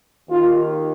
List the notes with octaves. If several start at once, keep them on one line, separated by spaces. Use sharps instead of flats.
D#2 D#3 F4